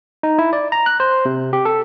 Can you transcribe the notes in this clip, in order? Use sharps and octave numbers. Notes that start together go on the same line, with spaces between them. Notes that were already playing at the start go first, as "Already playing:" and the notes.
D#4
E4
D5
A#5
F#6
C5
C3
G4
A4